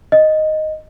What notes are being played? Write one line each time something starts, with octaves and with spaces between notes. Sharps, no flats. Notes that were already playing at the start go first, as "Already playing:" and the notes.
D#5